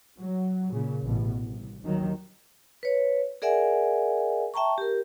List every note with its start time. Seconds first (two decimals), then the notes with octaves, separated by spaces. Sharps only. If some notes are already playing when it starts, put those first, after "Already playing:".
0.20 F#3
0.70 A#2 C#3
1.04 A1 B2
1.40 C2
1.84 D#2 D#3 F#3
2.83 B4 C#5
3.42 G#4 A#4 D5 E5 F#5 G#5
4.54 E5 G5 A5 A#5 C#6
4.78 G4 A#4